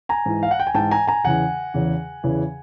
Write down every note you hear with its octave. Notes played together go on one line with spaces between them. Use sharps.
G#5 A#5
G#2 E3
F5
F#5
G5
G#5
G#2 E3 G5 A5
G#5 A#5
G#5 A#5
E2 C#3 E3 F#5 G#5
E2 C#3 E3
E2 C#3 E3